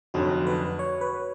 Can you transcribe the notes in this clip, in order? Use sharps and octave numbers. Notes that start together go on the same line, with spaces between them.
F1 F2 D3 F#3 F#4
B4
C#5
B4